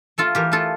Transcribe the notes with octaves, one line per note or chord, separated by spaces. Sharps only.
A3 F4 A4
E3 G4 A#4
A3 F4 A4